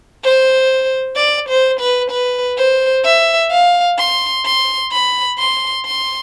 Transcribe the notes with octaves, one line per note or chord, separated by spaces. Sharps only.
C5
D5
C5
B4
B4
C5
E5
F5
C6
C6
B5
C6
C6